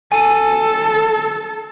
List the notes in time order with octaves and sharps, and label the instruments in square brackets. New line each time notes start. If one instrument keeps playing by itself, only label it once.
[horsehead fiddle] A4 [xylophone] G#5 D#7